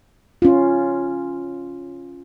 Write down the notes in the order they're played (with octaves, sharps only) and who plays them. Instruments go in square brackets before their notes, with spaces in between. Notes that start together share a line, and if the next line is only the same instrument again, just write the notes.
[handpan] C#4 F4